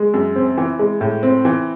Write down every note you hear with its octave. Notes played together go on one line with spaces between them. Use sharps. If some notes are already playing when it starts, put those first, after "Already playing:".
Already playing: G#3
F#2
C4
E3
G#3
A2
C4
E3